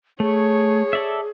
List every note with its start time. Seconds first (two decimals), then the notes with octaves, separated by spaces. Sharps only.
0.20 A3 G#4 C#5
0.93 A4 D5 E5